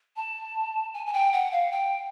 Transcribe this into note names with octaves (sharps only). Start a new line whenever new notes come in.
A5
G#5
G#5
G5
F#5
F5
G5